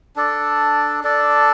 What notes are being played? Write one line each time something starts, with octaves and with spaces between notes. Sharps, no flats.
D4 A4 D5
D4 A4 D5